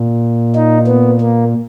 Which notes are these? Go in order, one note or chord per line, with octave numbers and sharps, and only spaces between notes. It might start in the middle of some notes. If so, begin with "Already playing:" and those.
Already playing: A#2
D#4
B3
A#3